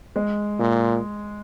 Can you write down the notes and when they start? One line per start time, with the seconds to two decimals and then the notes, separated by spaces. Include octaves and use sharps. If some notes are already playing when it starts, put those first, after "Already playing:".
0.16 G#3
0.59 A#2